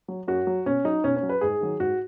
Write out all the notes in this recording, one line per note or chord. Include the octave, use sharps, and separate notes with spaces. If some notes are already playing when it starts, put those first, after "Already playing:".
F#3
F#2 F#4
F#3
B2 C#4
F#3 D#4
B2 C#4
C#4
F#3
B4
G#2 G#4
D#3 F#3
G#2 F#4